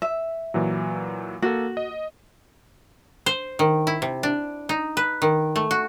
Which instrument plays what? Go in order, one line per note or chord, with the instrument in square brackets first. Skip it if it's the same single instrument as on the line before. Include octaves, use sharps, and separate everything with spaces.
[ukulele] E5
[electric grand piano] A#2 E3 F#3
[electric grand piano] A#3 A4 [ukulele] F#4
[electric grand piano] D#5
[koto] C5
D#3
E4
C3
D4
D#4
B4
D#3
A3
F#4